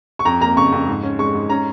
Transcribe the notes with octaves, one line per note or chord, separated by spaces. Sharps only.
C#6
F2 A#5
A#3 A#5
C#3 C#6
F2
G#2
C#4
G#3 C#6
G#2
C#4 A#5